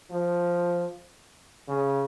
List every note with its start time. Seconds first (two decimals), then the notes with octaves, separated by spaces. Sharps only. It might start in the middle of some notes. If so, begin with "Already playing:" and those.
0.11 F3
1.68 C#3